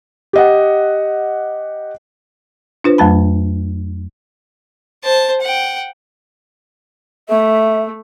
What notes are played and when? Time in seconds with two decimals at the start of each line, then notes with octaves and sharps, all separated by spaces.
0.33 G4 D#5 F#5
2.84 D4 F4 B4 C5
2.98 F2 F#3 A3 A5 B5
5.03 C5 A5
5.41 F#5 G5
7.29 A3 E5